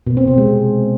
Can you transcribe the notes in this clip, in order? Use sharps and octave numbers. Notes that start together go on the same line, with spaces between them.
B2
C4
C3
G#3